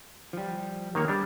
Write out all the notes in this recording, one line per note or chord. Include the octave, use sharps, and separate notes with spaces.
F3 G3
D#3 A#3 C#5
G3 D4